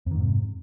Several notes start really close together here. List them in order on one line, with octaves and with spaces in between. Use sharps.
F2 D#3 G#2 C3